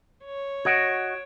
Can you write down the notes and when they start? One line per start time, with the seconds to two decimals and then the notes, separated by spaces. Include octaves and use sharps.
0.25 C#5
0.65 F#4 D#5 F#5 G#6 D7 E7